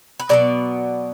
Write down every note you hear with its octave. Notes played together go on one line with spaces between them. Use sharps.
B4
B2 F#3 B3 D5